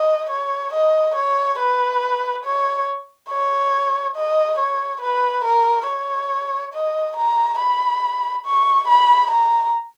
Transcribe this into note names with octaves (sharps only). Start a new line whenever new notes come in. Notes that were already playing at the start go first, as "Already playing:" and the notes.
Already playing: D#5
C#5
D#5
C#5
B4
C#5
C#5
D#5
C#5
B4
A#4
C#5
D#5
A#5
B5
C#6
B5
A#5